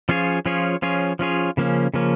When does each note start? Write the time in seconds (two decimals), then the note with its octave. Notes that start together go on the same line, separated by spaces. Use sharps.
0.09 F3 C#4 F4 G#4 C#5
0.46 F3 C#4 F4 G#4 C#5
0.82 F3 C#4 F4 G#4 C#5
1.19 F3 C#4 F4 G#4 C#5
1.57 C#3 F3 A#3 C#4
1.94 C#3 F3 A#3 C#4